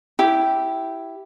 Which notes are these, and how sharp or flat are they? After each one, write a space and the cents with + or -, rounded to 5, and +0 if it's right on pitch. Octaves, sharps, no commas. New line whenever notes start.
E4 +0 G4 -10